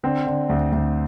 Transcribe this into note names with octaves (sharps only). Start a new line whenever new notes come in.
D3 C4
D3
D2
D2